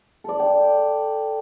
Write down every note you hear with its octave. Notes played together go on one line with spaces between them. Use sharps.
A4 D5
G5